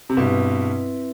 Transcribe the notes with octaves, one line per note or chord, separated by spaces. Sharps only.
C3
G2 B2 C4 E4 B4 E5